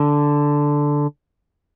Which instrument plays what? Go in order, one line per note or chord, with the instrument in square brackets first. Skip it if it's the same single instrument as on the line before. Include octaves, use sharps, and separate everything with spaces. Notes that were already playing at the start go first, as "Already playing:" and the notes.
Already playing: [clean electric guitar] D3